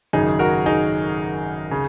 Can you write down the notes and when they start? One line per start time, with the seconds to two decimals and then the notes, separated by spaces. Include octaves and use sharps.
0.13 G#1 F#2 C#3 D#4 G#4
0.39 F#4 A#4
0.66 D#4 G#4
1.71 C#3